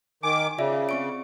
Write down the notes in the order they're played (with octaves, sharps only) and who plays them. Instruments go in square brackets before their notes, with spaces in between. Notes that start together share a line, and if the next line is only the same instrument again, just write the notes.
[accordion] D#3 D6 [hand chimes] G#5
[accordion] C#3 [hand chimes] F4 D5 E5
[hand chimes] C4 C#6 D7